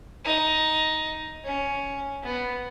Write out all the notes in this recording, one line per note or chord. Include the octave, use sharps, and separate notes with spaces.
D#4
C#4
B3